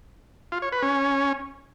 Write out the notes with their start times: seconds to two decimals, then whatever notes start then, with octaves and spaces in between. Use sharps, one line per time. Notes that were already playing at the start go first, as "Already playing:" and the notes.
0.52 F4
0.62 C#5
0.72 B4
0.83 C#4